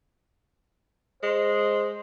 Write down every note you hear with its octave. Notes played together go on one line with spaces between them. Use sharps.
G#3 C5